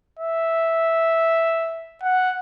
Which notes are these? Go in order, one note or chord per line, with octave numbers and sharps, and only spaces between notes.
E5
F#5